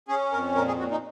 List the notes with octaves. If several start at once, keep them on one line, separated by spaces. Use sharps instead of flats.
C#4 G#4
F2 A#4
A#2 A#4
G#4
A#2 F#4
D#4